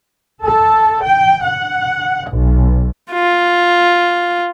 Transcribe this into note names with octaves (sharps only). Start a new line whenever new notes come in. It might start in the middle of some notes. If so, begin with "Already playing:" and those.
A4
G5
F#5
B1
F4